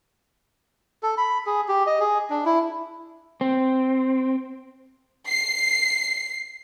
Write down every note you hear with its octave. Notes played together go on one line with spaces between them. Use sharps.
A4
B5
G#4
G4
D#5
G#4
D4
E4
C4
C7